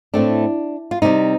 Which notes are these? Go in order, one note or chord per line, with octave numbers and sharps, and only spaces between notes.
A2 A3 C4 D4
F4
C3 G3 C4 D#4